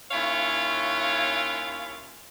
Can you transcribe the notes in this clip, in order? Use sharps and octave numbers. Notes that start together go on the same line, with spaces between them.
D#2 C#4 E4 F4 C#5 F5